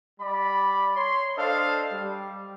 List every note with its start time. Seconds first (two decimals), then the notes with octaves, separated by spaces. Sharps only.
0.20 G3 D5 B5
0.95 C#5 C6
1.37 D4 A4 C5 D#5 F5
1.92 G3